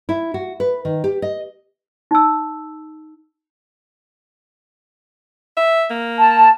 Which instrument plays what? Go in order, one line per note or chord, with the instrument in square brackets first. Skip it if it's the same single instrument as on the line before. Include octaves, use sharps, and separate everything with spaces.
[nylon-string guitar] E4
F#4
B4
D#3
G4
D#5
[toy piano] D#4 E6
[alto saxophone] E5
A#3
[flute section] A5